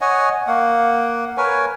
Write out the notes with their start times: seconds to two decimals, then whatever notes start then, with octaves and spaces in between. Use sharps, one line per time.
0.01 C#5 D#5 F#5 G#5
0.47 A#3 F#5
1.37 A#4 B4 C#5 G#5